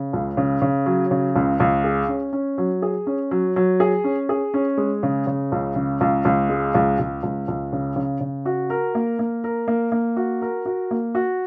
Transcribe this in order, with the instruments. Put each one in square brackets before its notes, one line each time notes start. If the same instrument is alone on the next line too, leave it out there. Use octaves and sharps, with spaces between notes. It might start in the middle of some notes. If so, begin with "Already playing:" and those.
Already playing: [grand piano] C#3
C#2
C#3
C#3
F#3
C#3
C#2
C#2
G#4
C#4
C#4
F#3
G#4
C#4
F#3
F#3
G#4
C#4
G#4
C#4
G#3
C#3
C#3
C#2
C#3
C#2
C#2
G#3
C#2
C#2
C#2
C#2
C#3
C#3
C#3
F#4
A#4
A#3
A#3
A#4
A#3
A#3
F#4
A#4
F#4
A#3
F#4